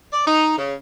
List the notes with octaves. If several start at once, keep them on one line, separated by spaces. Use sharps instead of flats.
D5
D#4
C#3